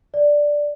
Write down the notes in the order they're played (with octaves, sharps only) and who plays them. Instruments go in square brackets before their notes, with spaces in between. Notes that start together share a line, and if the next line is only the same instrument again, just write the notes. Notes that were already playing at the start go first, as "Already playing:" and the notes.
[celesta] D5